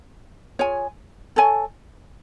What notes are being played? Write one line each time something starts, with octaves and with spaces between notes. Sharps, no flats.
F4 G#4 C#5 G#5
A4 C#5 G#5